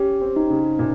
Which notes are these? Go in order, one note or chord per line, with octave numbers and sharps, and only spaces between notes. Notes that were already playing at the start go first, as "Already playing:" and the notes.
Already playing: C#4 G4
C4
D#4
C#3
A#2 A#3